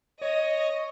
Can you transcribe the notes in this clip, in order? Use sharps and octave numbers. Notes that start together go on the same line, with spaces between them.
C#5 D#5